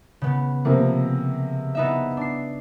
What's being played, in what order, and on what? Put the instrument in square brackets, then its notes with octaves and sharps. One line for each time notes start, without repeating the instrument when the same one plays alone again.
[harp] C#3 B3
[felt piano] C3 F3 A#3
[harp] B3 D#4 E5
D4 C7